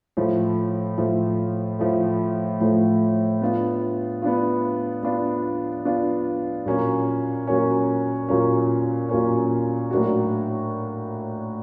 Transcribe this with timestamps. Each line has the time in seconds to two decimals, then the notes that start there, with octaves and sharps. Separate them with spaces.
0.17 A2 F3 A3
0.98 A2 F3 A3
1.79 A2 F3 A3
2.60 A2 F3 A3
3.42 B3 D4 F4
4.22 B3 D4 F4
5.03 B3 D4 F4
5.85 B3 D4 F4
6.66 A#2 F#3 A#3 C#4
7.47 A#2 F#3 A#3 C#4
8.29 A#2 F#3 A#3 C#4
9.09 A#2 F#3 A#3 C#4
9.90 A2 F#3 A#3 D4 F#4